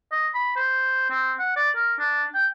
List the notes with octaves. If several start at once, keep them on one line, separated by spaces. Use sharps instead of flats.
D#5
B5
C5
C4
F#5
D5
A#4
D4
G5